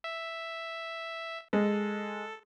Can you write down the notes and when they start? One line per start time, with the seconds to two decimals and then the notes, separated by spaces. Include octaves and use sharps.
0.04 E5
1.53 G#3 A4